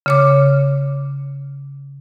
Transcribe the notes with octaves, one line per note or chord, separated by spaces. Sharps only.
C#3 C#5 D6